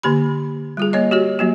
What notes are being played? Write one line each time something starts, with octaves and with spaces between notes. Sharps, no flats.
D3 A#3 G4 B5
G3 F4 G#4
A#3 C#5 D#5
F#4 G4 C#5
F#3 A#3 F#4